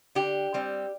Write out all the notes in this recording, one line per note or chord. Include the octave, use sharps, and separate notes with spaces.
D3 G4
G3 C4